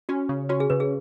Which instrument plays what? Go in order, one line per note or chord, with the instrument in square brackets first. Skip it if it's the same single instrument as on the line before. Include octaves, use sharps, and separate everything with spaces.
[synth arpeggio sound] C#4 [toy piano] F#4
[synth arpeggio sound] C#3
[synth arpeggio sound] C#4 [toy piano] F#4
[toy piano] G#4
[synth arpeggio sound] C#3 [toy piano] B4
[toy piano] G#4